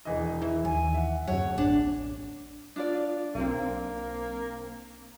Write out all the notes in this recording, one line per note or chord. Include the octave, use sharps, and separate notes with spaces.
E1 E3 D#5
E3 E5
D#2 G#5
E5 F#5
D1 F#2 C#5 F#5
A1 D4
D4 F4 D5
B1 A#3 C4